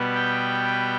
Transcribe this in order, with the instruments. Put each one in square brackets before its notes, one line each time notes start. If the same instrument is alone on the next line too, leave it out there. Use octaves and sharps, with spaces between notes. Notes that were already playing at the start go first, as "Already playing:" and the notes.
Already playing: [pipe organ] B2 G3 B3
G5